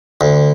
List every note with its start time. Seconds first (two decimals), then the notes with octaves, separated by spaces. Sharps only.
0.21 D2